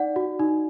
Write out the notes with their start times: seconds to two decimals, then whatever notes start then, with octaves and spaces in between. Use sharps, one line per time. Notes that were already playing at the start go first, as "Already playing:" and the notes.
Already playing: D#4 D5 F#5
0.16 F#4
0.40 D#4